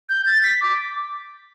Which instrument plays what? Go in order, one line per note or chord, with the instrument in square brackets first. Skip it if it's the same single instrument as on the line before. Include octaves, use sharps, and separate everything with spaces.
[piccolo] G6
A6
B6
D6